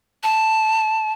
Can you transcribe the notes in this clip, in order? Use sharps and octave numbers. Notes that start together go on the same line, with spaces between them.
A5